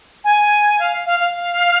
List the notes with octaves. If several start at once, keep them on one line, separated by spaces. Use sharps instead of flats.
G#5
F5
F5
F5